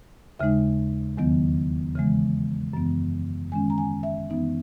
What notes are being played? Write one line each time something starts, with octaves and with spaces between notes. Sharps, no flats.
D#2 C#3 G#3 D#4 E5
E2 D#3 F#3 B3
C#3 E3 G#3
F#2 E3 B3
D#3 G#3 C#4 G#5
A#5
G#5
E5
F#2 E3 B3 D#4 E5